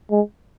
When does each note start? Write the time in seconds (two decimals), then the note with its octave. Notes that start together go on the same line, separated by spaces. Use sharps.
0.11 G#3